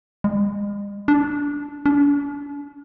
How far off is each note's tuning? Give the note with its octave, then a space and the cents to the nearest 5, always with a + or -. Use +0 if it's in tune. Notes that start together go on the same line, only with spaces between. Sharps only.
G#3 -40
D4 -15
D4 -45